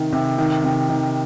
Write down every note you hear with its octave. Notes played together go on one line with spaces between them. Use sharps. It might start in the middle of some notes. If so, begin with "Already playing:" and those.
Already playing: C3 D#3
C3
D#3
C3
D#3